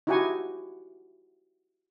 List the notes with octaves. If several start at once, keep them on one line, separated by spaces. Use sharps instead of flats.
D#4 E4 F#4 G4 F#5 G#5